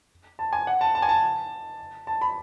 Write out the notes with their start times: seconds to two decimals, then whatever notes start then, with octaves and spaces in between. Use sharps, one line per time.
0.39 A5
0.53 G#5
0.67 F#5
0.81 A5
0.95 A5
1.02 G#5
1.09 A5
2.07 A5
2.21 B5